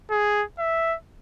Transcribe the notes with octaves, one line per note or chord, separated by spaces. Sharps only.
G#4
E5